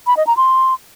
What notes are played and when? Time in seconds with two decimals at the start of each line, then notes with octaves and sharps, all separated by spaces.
0.07 B5
0.17 D#5
0.27 A#5
0.37 C6